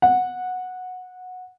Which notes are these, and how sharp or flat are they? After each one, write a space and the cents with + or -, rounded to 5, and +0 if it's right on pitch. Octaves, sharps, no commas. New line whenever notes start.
F#5 -15